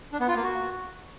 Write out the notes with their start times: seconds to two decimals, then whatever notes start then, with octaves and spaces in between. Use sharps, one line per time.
0.13 D4
0.20 B3
0.28 F4
0.36 A#3
0.43 F#4